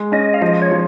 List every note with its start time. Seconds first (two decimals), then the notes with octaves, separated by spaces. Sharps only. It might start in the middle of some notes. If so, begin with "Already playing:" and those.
Already playing: G#3
0.12 C#4 D#5
0.34 F5
0.42 F3 D#5
0.62 C#5
0.72 F3